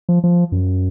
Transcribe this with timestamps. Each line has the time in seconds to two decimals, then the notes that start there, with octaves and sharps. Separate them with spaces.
0.09 F3
0.24 F3
0.52 F#2